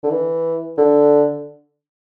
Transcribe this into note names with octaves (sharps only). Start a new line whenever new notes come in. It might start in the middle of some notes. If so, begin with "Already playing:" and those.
D3
E3
D3